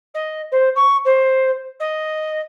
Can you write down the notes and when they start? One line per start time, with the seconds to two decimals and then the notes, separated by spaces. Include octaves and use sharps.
0.14 D#5
0.51 C5
0.75 C#6
1.05 C5
1.80 D#5